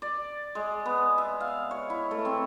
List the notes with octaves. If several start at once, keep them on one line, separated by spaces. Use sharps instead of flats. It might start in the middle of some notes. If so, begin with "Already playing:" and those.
D5
G#3
B3
E5
F5
C#5
E4
A3
C4